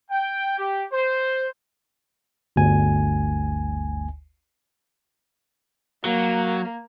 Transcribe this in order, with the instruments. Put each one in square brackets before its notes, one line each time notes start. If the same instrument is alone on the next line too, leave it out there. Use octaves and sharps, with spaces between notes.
[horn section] G5
G4
C5
[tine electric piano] G1 D2 G#5
[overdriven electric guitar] F#3 [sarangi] A#3